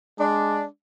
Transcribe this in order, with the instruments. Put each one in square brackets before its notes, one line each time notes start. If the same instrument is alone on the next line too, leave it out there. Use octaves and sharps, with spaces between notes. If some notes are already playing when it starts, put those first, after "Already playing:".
[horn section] G#3 D4